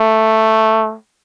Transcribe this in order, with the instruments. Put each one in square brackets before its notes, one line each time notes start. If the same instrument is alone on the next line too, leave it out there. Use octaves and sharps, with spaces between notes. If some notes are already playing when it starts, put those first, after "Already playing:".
Already playing: [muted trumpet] A3